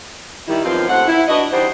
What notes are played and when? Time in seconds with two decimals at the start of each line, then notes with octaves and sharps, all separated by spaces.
0.48 D#3 G3 E4
0.64 F#2 B2 D#3 F3 C4 F4
0.89 D#2 A3 C4 F#5
1.08 E4
1.28 D4 F#4 B4 D#5
1.53 E3 G3 D#4 F#4 C5